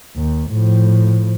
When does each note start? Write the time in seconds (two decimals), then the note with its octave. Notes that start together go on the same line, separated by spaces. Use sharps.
0.17 D#2
0.51 A2 F3